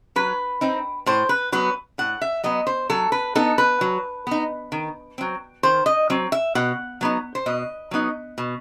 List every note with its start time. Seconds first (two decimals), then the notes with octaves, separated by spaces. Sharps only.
0.16 F#3 B4
0.61 C4 D#4
1.06 A2 C5
1.29 B4
1.52 F#3 B3 B4
1.98 A2 F#5
2.22 E5
2.44 F#3 B3 D#5
2.67 C5
2.90 F#3 A4
3.12 B4
3.35 B3 D#4 A4
3.58 B4
3.81 F#3
4.27 B3 D#4
4.72 D#3
5.18 F#3 C4
5.63 D#3 C5
5.86 D#5
6.10 F#3 C4
6.32 E5
6.55 B2 F#5
7.01 F#3 B3 D#4
7.35 C5
7.46 B2 D#5
7.91 F#3 B3 D#4
8.38 B2